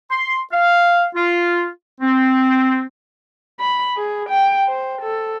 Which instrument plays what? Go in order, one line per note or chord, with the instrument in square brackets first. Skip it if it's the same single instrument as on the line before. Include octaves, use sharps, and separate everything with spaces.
[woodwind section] C6
F5
F4
C4
[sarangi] B5
G#4
G5
C5
A4